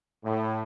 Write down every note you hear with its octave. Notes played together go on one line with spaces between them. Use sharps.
A2